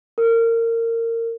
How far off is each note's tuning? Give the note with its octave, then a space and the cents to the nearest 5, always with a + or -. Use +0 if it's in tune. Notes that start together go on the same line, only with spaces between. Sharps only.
A#4 -25